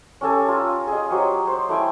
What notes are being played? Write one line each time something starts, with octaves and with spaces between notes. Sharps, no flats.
C#4 G4 A4 G#5
F4 A#5
G#4 D#5
F#3 G4 C5
C5
A3 E4 G5 G#5